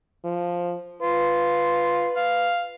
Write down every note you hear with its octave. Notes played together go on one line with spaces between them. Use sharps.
F3
F4 B4
F5